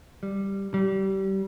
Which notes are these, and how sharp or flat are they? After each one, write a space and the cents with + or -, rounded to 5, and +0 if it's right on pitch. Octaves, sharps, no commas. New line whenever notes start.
G3 +5
G3 -25